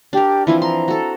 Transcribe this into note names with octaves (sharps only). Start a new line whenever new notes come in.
D4 G4 A#4
E3 F3 C4 E4
A#5 C6
F#4 A4